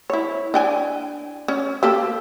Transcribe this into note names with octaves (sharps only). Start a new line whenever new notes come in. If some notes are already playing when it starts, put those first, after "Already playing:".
E4 C#5
D4 G5 G#5
C#4
A#3 G4 A4